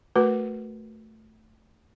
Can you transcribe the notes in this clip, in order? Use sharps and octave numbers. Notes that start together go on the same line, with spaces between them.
A3 F#4 A#4 B4